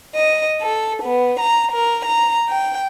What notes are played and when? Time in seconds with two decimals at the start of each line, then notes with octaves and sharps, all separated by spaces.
0.14 D#5
0.62 A4
1.03 B3
1.40 A#5
1.71 A#4
2.06 A#5
2.48 G5